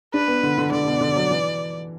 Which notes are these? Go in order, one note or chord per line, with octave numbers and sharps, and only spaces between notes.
D4 B4
B3
D3
D3
D3 D5
B2
D3
F#3
E3